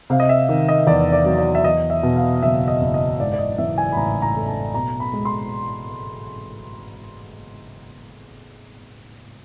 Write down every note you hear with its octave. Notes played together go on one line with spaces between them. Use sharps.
C3 F5
D#5
E5
D#3
D#5
E2 D5
D5
F#3
D5
E5
E2 D#5
E5
B2
F5
F#1 E5
D#5
F#1
D#5
G#2 D5
D5
D#5
E3 E5
G#5
B5
A1 A#5
A#5
A3
A5
B2 A#5
B5
G#3
C6